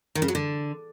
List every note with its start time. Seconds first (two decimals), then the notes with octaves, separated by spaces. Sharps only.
0.15 D#3
0.22 C#3
0.28 F#3
0.35 D3